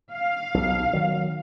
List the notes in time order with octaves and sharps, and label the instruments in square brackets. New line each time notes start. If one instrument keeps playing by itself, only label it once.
[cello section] F5
[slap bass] B1
D#3 F#3